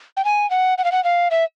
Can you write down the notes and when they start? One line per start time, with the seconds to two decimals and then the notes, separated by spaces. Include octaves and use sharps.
0.17 G5
0.25 G#5
0.50 F#5
0.78 F#5
0.84 F5
0.92 F#5
1.04 F5
1.31 E5